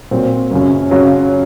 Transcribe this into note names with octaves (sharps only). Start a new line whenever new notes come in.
A#2 F#3 C4
F#2 C#3 F#3 C#4
C#3 F#3 C#4 F4